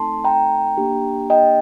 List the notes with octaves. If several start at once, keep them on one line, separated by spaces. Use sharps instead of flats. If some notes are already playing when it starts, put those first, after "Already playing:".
Already playing: A3 C4 D#4 A4 A5 C6
G5 A#5
A#3 D4 G4
D#5 G5